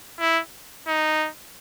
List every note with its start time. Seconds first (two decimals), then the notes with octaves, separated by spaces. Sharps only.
0.20 E4
0.88 D#4